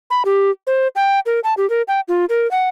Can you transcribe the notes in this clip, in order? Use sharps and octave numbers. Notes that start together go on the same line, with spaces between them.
B5
G4
C5
G5
A#4
A5
G4
A#4
G5
F4
A#4
F#5